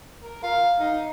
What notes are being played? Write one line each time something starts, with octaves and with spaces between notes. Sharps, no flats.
A#4
F5
D#4